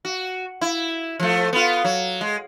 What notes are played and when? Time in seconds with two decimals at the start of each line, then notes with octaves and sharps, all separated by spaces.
0.05 F#4
0.61 E4
1.20 F3 A3
1.53 B3 F4
1.84 F#3
2.21 G#3